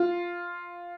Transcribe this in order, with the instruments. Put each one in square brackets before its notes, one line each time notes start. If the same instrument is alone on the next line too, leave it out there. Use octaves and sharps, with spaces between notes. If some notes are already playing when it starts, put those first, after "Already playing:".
Already playing: [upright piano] F4